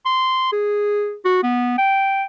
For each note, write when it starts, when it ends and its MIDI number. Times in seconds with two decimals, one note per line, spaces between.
0.06 0.49 84
0.52 1.16 68
1.25 1.40 66
1.43 1.74 59
1.78 2.24 79